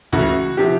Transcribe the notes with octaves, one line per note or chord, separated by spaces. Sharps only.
C#2 C#3 E3 A3 F#4
C3 F3 G4